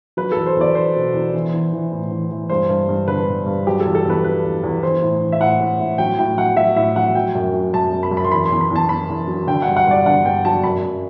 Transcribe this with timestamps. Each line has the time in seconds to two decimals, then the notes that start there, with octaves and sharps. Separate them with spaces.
0.17 F#3 B4
0.32 E2 A4
0.47 C5
0.56 E2 D5
0.75 E2 C5
0.95 B2
1.14 E2
1.34 E3
1.53 E3
1.73 E3
1.92 A2
2.11 E3
2.31 E3
2.49 G2 C5
2.69 G2
2.89 G2
3.08 D3 B4
3.28 G2
3.46 G2
3.67 F#3 G4
3.80 A4
3.85 E2
3.95 A4
4.06 E2 B4
4.24 E2 B4
4.44 E2
4.63 E2
4.83 E3 C5
5.02 A2
5.21 E3
5.32 E5
5.40 A2 F#5
5.60 A2
5.80 A2
5.98 F#3 G5
6.19 A2 G5
6.38 F#3 F#5
6.56 F#3 E5
6.76 A2 E5
6.96 F#3 F#5
7.15 F#3 G5
7.35 F#2
7.54 F#3
7.73 F#2 A5
7.93 F#2
8.03 B5
8.11 F#2
8.17 B5
8.24 C6
8.32 E2 B5
8.46 C6
8.51 E2
8.61 B5
8.71 E2 A5
8.89 E2 B5
9.09 E2
9.28 F#3
9.47 D3 G5
9.62 G2 F#5
9.76 F#5
9.87 G2 D5
10.06 D3 F#5
10.25 G2 G5
10.45 F#3 A5
10.64 F#2 B5
10.83 F#2